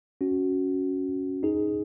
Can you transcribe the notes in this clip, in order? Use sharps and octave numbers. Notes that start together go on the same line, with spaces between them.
C#4 F#4
D#4 G#4